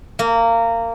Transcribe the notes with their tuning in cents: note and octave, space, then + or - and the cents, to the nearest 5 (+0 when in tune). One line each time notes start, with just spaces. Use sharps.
A#3 -20